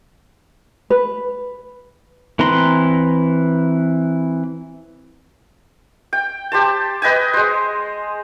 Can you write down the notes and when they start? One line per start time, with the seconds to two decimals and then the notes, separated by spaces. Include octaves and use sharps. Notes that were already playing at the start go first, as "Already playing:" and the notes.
0.90 B4
2.39 E3 C4 B4 A#5 C6
6.13 G5
6.52 G4 C5 A5
7.02 B4 D#5 G5 G#5
7.34 G#3 C5